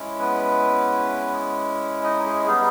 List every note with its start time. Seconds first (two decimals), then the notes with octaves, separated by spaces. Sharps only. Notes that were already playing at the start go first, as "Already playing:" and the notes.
Already playing: G#3 C#4 E4
0.19 B3 B4
2.03 D#4 D#5
2.26 G#4
2.47 G3 B3 D#4 G#4